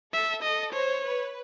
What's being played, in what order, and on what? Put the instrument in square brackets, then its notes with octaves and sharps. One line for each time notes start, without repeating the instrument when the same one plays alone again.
[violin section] A4 [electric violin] E5
[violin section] A4 [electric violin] D#5
[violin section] C5 [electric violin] C#5
[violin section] B4